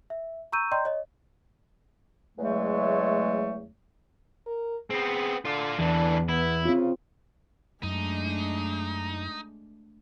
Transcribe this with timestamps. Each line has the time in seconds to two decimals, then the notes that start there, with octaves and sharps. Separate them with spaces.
0.10 E5
0.52 A#5 C#6 E6 G6 D#7
0.71 D5 D#5 G5 A#5 C6 G6
0.85 C#5 D#5
2.38 E2 C#3 F#3 G#3 A3
4.47 A#4
4.90 B3 C4 G#4
5.45 D3 F4 D5
5.79 E2 D3 E3 D4
6.29 B3 E4
6.65 C#3 C4 F4
7.83 F#2 G#3 A3 D4 D#4